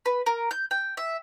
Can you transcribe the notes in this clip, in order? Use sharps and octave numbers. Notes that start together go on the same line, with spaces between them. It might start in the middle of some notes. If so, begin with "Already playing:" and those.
B4
A#4
G6
G5
E5